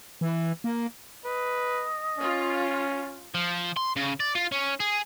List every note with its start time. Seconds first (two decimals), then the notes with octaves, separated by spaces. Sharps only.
0.21 E3
0.64 A#3
1.25 B4 D#5
2.18 C#4 F4
3.34 F3
3.77 C6
3.96 C#3
4.20 D5
4.35 F4
4.52 C#4
4.80 G#4